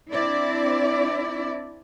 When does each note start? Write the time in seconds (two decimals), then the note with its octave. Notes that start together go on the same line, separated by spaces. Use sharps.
0.11 C4 D4 E4 D5